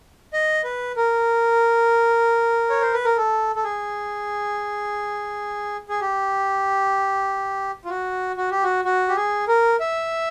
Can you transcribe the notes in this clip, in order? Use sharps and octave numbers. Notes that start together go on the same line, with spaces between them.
D#5
B4
A#4
C#5
C5
B4
A#4
A4
A4
G#4
G#4
G4
F4
F#4
F#4
G4
F#4
F#4
G4
G#4
A#4
E5